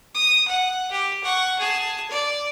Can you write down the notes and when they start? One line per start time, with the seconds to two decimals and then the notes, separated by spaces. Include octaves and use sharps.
0.15 D#6
0.47 F#5
0.91 G4
1.24 F#5 C#6
1.58 G#4 A5
2.10 D5